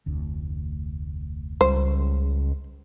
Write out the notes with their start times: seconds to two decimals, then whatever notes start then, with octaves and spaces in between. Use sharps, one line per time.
0.06 F1 D2
1.61 C#2 G3 C5